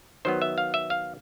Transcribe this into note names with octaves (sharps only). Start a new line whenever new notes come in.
D#3 F#3 B3 C5
E5
F5
E5
F5